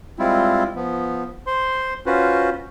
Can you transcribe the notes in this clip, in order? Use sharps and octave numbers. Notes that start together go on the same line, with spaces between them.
G3 G#3 C4 E4 F4
F3 B3
C5 C6
C#4 F4 F#4 B4 C5